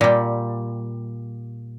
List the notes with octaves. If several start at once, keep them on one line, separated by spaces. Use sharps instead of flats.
A#2 G3